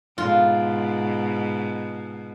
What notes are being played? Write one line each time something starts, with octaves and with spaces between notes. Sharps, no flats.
G#2 B2 F4